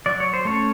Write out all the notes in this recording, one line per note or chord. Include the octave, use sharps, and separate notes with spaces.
F#3 D5
C#5
C5
A3 C#4 C#5